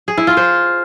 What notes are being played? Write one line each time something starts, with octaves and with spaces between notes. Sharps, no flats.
G#4
E4
F4
C5